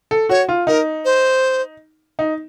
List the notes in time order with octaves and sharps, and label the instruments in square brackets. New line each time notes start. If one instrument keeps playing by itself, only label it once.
[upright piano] A4
[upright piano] F#4 [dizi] C#5
[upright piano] F4
[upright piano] D#4 [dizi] A#4
[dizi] C5
[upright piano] D#4